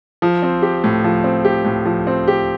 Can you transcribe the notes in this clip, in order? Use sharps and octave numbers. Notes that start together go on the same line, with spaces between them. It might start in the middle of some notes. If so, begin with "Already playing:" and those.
F3
C4
G4
A2
F3
C4
G4
A2
F3
C4
G4